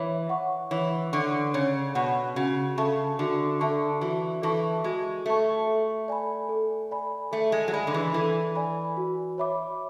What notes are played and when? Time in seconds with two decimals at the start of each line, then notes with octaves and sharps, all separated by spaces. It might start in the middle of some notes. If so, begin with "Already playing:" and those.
Already playing: E3 C#5
0.29 F#5 C#6
0.71 E3 C#5
1.13 D3 F#5 C#6
1.54 C#3 C#5
1.95 B2 F#5 C#6
2.36 C#3 F#4
2.78 C#3 A4 E5 A5 C#6
3.19 D3 F#4
3.60 D3 A4 E5 A5 C#6
4.01 E3 F#4
4.42 E3 A4 E5 A5 C#6
4.84 G#3 F#4
5.26 A3 A4 E5 A5 C#6
5.67 A4
6.08 D5 G#5 B5
6.49 A4
6.91 D5 G#5 B5
7.32 A3 A4
7.52 G#3
7.68 F#3
7.73 G#3 D5 G#5 B5
7.87 D3
7.94 E3
8.14 E3 A4
8.55 D5 G#5 B5
8.97 F#4
9.38 C#5 E5 B5 D6